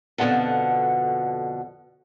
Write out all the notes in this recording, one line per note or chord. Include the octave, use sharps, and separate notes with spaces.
F2 B2 D3 G#3 F#5 A5